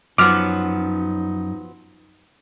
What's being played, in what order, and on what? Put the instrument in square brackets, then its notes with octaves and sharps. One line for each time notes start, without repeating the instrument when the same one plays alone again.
[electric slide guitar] F#2 [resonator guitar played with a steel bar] F3 F#3 B3 [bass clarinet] D#4 [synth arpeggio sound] D6 F6